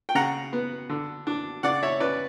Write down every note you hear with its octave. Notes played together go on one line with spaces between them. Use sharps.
G5
C#3 F#5 A#5
B3
D3
D4
C#3 D5 F#5
C#5 E5
C#4 B4 D5